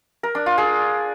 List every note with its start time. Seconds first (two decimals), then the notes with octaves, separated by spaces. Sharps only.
0.23 A#4
0.35 D4
0.46 F4
0.58 G#4